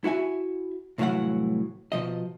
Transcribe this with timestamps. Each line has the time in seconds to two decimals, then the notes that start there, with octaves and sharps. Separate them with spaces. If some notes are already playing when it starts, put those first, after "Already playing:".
0.04 E4 F#4 E5 G#5
0.98 C2 A2 E3 F#3 F5 F#5
1.92 B2 F3 D#5